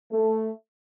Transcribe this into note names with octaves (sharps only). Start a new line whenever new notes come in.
A3